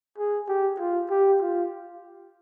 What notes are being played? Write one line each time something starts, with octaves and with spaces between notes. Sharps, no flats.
G#4
G4
F4
G4
F4